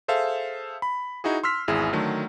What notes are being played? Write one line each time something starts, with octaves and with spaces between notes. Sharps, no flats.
G#4 A4 C5 E5 F5
B5
D#4 E4 F#4 G#4
C6 E6 F6 B6
G#1 E2 E4 G#4
D3 D#3 F#3 A3